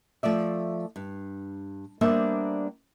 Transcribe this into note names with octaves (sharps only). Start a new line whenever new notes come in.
F3 A3 D5 E5
G2
G3 A#3 B3 D4 C5 E5